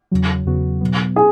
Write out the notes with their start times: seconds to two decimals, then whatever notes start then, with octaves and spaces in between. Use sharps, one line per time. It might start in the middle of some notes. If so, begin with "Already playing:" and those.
0.11 E2 C#3 F#3
0.46 E2 C#3 F#3 B3 F#4
0.81 B2 F#3 B3
1.16 C#4 G#4